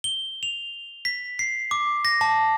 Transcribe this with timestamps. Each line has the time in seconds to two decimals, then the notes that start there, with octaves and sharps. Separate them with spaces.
0.04 G7
0.43 F7
1.05 B6
1.39 C7
1.71 D6
2.05 A#6
2.21 A5